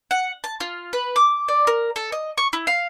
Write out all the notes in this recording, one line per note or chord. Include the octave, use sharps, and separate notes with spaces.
F#5
A5
F4
B4
D6
D5
A#4
A4
D#5
C#6
E4
F5